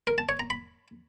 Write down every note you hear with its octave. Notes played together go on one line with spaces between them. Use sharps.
A#4
A5
C#5
A#5
B5